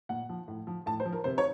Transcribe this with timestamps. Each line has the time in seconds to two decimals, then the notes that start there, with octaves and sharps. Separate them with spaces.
0.09 A#2 F#5
0.29 F3
0.48 A2
0.67 F3
0.86 A2 A5
1.00 C5
1.05 F3
1.12 A#4
1.24 C3 C5
1.38 C#5